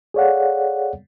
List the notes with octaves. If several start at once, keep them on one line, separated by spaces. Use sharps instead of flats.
G#4 A4 C#5 D5 F5 F#5